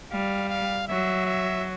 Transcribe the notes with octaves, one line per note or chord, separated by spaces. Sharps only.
G3 F5
F5
F#3 E5
E5